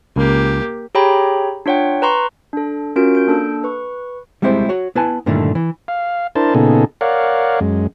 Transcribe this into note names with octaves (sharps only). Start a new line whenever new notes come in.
C#2 A#3 G4
G4 G#4 C#5 G5 A#5 B5
D4 F4 C#5 F#5 G5
B4 A#5 C6 C#6
D4 A4
C#4 F4 F#4 A#4 D7
G6 D7
A#3 D4 A4 E6
B4 C#6
G3 G#3 C4 E4 G4 C5
F#4 C#5
B3 E4 B4 G#5 A5
G2 A#2 D3 D#3 A3 E4
E3
F5
D4 E4 A#4 C5 A5
A#2 C#3 B3 D#4 G#4 A4
A#4 C#5 D5 F5 F#5
F#2 G#3